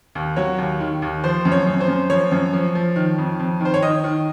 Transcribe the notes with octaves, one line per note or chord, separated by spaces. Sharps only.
D#2
F#3 C#5
D#2
D#3
D#2
F3 C5
F#2
C#5
F#2
C5
F#2
F3 C#5
F#2
F3
F3
D#3
F2
F2
D#3 C5
C#5
D#3 D#5
D#3